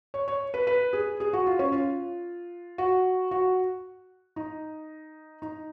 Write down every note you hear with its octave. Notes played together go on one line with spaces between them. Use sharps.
C#5
C#5
B4
B4
G#4
G#4
F#4
F4
C#4
F4
F#4
F#4
D#4
D#4